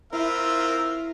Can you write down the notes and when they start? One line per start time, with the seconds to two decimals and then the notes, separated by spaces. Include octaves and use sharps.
0.13 C4 E4 F4 A#4 E5